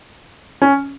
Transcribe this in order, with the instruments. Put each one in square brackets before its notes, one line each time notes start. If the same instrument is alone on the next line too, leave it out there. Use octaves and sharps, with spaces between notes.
[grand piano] C#4